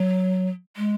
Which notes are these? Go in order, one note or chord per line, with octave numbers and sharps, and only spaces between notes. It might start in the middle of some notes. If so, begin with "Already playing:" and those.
Already playing: F#3
G#3